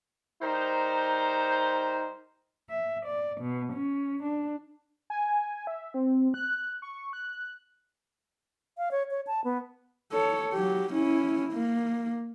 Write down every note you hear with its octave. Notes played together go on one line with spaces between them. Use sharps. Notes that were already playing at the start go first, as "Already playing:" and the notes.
G3 D#4 A#4 C5
E5
D5
B2
C#4
D4
G#5
E5
C4
F#6
C#6
F#6
F5
C#5
C#5
A5
B3
A4 C#5
F#3 G4
C#4 E4
A#3